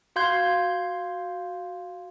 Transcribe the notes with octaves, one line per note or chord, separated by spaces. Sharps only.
F#4 F5 C6 G6 G#6